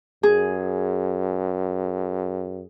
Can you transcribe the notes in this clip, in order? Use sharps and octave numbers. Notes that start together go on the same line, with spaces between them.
F#2 G#4